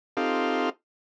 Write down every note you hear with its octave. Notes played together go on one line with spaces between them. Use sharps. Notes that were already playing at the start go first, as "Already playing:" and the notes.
C4 D#4 F4 G4 A4 F5